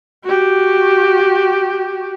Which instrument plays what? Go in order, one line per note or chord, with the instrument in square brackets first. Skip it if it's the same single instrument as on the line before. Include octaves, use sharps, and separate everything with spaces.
[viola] F#4 G4